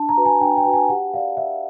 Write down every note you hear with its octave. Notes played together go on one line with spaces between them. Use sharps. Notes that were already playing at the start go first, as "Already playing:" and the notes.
Already playing: D4 A5
A#5
F#4 B4
G#5
D4 G5
G5
F#4 B4
G#5
G4 F#5
A#4 D5 F5
G4 E5